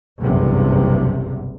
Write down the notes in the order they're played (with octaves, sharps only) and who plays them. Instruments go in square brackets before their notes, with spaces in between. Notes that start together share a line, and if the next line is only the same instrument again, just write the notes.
[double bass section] F#1 B1 E2 G2 C3